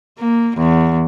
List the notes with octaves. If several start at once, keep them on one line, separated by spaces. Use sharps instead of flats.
A#3
E2